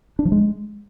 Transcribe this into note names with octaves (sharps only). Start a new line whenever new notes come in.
D4
F3
G#3